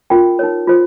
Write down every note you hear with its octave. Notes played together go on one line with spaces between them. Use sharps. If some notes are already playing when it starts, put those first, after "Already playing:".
C#4 F4 A#4 G5
D#4 A#4 C#5
F4 C5